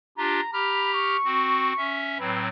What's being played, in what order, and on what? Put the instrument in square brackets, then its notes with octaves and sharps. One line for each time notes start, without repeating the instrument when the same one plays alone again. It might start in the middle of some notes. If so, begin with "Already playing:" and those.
[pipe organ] D4 F4 G4 [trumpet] A#5
[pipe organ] G4 A#5 F6 [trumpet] B5
[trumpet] C#6
[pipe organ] C4 F#4
C#4 E5
[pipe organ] A2 F#3 C4 [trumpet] B4